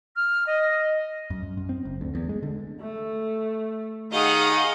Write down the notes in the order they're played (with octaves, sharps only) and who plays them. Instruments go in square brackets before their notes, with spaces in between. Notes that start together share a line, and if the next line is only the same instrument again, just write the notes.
[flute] F6
D#5
[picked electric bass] F#2
F#2
F#2
C4
F#1
D2
E2
G#3
D3
[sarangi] A3
[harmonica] D#3 D#5 [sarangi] G#4 [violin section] F5 F#5 D#6